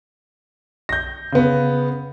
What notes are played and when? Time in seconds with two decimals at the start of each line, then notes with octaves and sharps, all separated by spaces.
0.89 G6 A#6
1.32 C#3 B3